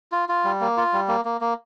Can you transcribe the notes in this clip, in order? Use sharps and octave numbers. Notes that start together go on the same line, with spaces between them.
F4
F4
G3
A#3
F4
G3
A#3
A#3
A#3